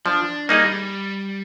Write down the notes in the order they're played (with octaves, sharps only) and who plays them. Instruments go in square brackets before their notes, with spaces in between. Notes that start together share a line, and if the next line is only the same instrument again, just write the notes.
[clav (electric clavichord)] F3 [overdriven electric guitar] D4
[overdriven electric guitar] G3 [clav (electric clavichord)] A#3 D#4 G#4 D#5